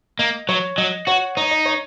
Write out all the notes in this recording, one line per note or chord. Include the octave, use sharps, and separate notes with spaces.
A#3 D#5
F#3 C#5
F#3 D#5
F#4 C#5 F#5
D#4 C#5
D#5
C#5